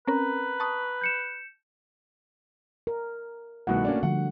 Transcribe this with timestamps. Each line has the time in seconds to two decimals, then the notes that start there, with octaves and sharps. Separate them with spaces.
0.07 C4 C#4 A#4 B4 A#5
0.60 A5 C#6 D#6
1.01 G6 C#7 E7
2.87 A#4
3.67 C2 B2 D#3 A3 F#4 F#5
3.85 A#3 C#4 D4
4.03 D3 F3 G3 F#5